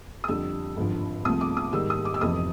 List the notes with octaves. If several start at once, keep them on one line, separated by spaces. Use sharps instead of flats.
D#6
F2 D3 G3 E6
G#1 G2 D3 F3
C2 C3 F3 A3 D#6
D6
D#6
G#2 D#3 G3 E6
D#6
D6
E6
F1 F2 C3 E3 D#6